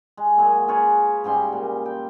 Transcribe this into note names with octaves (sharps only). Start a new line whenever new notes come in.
G#3
A#2 F#3 G#4
F4 G#4 B4 C#5
G#2 C#3 G3 C6
A#2
G5